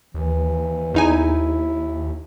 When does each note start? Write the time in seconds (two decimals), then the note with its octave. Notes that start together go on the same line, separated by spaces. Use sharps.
0.14 D#2 E3
0.94 E2 D#4 E4 G#5